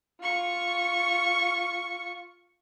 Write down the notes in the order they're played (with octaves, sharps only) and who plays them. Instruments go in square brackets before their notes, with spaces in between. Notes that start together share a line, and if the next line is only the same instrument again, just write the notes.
[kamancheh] F4 C#6